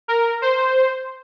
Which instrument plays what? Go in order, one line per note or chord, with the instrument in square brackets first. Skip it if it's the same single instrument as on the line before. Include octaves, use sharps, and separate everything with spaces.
[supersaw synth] A#4
C5